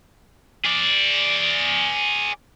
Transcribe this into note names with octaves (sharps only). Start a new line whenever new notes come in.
G#4 D5